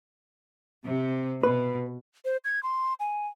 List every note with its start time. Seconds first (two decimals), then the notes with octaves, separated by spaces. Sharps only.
0.84 C3
1.43 B2 B4
2.25 C5
2.45 G#6
2.63 C6
3.00 G#5